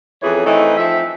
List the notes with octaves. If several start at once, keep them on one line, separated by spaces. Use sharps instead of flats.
F2 E3 C#4 G#4 C#5
E3 A3 C4 D#4
F3 C4 E5